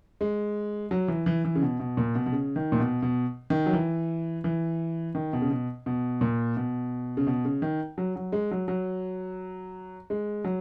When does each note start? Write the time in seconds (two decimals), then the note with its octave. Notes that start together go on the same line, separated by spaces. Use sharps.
0.21 G#3
0.91 F#3
1.08 E3
1.26 E3
1.44 E3
1.55 C#3
1.62 B2
1.80 B2
1.97 A#2
2.15 B2
2.26 B2
2.32 C#3
2.56 D#3
2.72 A#2
2.80 B2
3.02 B2
3.50 D#3
3.66 F#3
3.73 E3
4.44 E3
5.15 D#3
5.33 B2
5.42 C#3
5.50 B2
5.86 B2
6.21 A#2
6.57 B2
7.17 C#3
7.27 B2
7.45 C#3
7.62 D#3
7.98 F#3
8.16 F#3
8.32 G#3
8.51 F#3
8.68 F#3
10.10 G#3
10.44 F#3